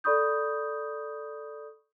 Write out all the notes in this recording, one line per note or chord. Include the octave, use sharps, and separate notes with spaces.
A4 D5 B5 C#6 D#6 G6